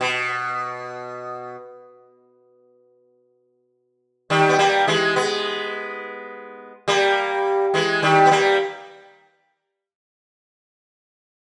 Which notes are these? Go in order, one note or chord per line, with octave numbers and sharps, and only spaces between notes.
B2
D#3 G3
B3
G3 A#3
E3 G#3
G#3 B3
G3 A#3
E3 G#3
D#3 G3
B3
G3 A#3